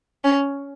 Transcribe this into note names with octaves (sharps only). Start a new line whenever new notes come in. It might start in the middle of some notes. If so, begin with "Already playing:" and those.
C#4